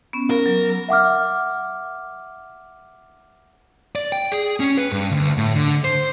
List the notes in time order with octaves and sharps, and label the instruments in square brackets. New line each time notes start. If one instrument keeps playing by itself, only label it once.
[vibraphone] B3 C#4
[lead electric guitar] A#4
[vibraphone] F#3
[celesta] E5 F#5 D6 F6
[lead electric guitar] D5
G5
G#4
C#4
B4
G2
D2
A2
D3
C5